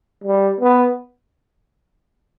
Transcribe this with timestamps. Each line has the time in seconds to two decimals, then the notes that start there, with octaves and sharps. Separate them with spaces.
0.24 G3
0.61 B3